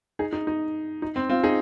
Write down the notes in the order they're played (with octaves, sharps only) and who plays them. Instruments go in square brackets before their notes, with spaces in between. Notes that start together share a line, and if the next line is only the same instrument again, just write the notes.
[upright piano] D#4 G#4
D#4
D#4
D#4
C4
C4 F4
D#4 G#4